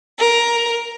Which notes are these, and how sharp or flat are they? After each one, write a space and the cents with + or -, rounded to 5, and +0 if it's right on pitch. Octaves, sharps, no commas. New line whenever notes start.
A#4 +10